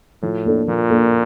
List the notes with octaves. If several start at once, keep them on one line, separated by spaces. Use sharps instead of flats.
A2 F3
A#3 D4 A4
A#2 F3
A#3 D4 A4